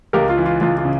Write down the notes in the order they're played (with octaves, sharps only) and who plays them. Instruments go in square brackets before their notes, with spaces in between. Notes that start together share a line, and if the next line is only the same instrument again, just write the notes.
[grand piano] C#2 [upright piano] G4 A#4
[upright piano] F4
[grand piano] E3
[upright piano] F4
[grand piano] C#2 [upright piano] F4
[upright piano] F4
[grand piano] C#3